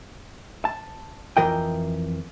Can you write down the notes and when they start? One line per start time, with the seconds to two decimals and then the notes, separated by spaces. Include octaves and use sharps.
0.65 A5
1.37 F2 E3 A#4 D#5 G5